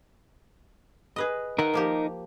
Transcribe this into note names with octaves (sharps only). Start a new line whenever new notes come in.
G#4 B4 D#5
D#4 A#4 E5 F#5
F3 A#3 G4